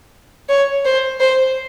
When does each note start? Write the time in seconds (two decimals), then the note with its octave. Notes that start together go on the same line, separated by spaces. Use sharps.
0.49 C#5
0.85 C5
1.20 C5